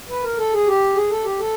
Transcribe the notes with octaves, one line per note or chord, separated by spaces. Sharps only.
B4
A#4
A4
G#4
G4
G#4
A4
G4
A4